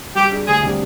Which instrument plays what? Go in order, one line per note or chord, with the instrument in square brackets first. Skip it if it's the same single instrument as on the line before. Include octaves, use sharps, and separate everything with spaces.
[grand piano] G3 [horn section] G4
[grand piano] D4 G#4 D5
[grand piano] D2 [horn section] G#4
[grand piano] C3 G3 D4 G4